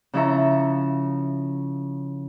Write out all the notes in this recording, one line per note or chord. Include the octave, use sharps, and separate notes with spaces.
C#3 F3 E4 C#5 E5 A#5